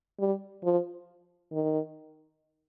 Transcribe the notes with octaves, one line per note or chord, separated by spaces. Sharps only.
G3
F3
D#3